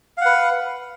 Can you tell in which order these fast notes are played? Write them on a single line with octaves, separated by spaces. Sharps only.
F5 F#5 B4